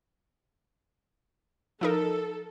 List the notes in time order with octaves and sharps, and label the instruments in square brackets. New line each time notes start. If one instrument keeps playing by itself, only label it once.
[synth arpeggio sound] F3 D#4 A#4 [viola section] A4